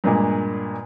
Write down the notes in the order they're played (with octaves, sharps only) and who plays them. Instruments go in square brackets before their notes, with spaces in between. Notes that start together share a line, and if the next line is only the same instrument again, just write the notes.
[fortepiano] G2 A#2 G#3